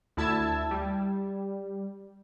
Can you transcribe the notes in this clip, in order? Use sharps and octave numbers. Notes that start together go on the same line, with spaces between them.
D2 E4 A5 E6 G#6
G3